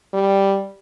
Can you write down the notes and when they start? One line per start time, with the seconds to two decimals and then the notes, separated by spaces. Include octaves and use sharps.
0.14 G3